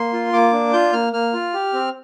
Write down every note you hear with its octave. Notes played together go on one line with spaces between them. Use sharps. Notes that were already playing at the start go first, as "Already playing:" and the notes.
Already playing: A#3 C6
F4
A#3 D6
D4
F4 G6
A#3 F6
A#3 F6
F4
G4
C4